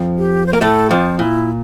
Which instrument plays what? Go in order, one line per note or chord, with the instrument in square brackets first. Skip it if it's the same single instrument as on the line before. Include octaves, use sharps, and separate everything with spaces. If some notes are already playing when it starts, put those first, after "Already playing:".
Already playing: [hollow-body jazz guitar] F2 F3
[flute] G4
C5
[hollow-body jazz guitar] A#3 [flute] A#4
[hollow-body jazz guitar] A2 A3 [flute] A4
[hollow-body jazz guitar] F2 F3 [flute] F4
[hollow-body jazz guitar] A#2 [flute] E4